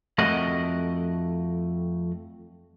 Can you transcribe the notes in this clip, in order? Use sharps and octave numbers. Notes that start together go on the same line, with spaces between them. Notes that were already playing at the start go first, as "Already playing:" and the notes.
F2 A3 F#4 A#4 D#5 F#5